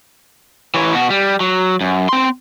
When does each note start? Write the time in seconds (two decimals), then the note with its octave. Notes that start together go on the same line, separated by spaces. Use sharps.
0.74 E3 C#5
0.93 B2 F#4
1.10 G3
1.40 F#3
1.81 F#2
2.09 C4 C6